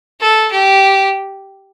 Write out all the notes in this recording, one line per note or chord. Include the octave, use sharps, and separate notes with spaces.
A4
G4